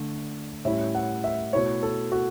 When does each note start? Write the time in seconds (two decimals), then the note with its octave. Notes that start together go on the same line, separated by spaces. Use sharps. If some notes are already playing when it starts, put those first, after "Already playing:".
Already playing: D3 A3 D4
0.65 A2 G3 C#4 E4 E5
0.95 F#5
1.24 E5
1.53 B2 A3 E4 C#5
1.83 A4
2.12 F#4